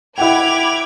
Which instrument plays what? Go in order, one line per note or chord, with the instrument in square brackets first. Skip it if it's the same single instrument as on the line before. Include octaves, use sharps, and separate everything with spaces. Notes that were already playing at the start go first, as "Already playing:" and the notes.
[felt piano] E4 F#5 G5 [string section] B5 D6 G#6 [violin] F7